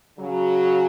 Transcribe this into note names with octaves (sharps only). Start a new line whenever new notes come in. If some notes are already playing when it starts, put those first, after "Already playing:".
C#3 F#3